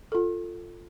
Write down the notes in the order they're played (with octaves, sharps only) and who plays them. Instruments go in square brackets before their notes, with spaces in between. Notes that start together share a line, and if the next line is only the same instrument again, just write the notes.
[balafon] F4 A4